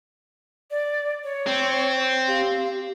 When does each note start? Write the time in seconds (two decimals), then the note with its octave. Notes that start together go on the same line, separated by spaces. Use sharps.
0.71 D5
1.24 C#5
1.47 C4
2.28 G4 F5